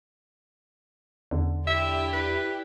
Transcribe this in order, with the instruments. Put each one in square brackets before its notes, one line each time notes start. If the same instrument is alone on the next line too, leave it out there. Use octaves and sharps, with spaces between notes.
[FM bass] E2 [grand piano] D3
[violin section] E4 G4 D5 [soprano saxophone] E5
[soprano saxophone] B4